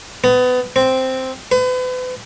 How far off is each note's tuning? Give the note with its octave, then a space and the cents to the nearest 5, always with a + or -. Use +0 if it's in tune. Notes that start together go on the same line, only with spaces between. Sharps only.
B3 +25
C4 +0
B4 +40